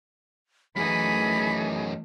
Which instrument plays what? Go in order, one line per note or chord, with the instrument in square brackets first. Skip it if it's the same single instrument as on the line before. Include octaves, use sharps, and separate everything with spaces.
[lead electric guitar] F#2 D#4 [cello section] E3 A3 [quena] G#4 [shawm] B5